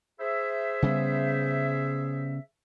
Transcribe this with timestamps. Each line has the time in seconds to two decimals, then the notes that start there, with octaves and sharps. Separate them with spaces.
0.20 G#4 C5 E5
0.82 C#3 G3 B3